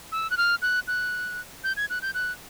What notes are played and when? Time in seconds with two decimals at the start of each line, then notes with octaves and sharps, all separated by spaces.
0.12 E6
0.30 F#6
0.38 F6
0.62 F#6
0.88 F#6
1.64 G6
1.77 G#6
1.90 F#6
2.02 G6
2.14 F#6